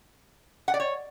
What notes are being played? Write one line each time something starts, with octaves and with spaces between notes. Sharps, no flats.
F#5
D5
C#5